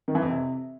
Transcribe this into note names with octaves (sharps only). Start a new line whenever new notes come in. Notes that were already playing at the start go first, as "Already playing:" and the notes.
D#3
E3
F2
C3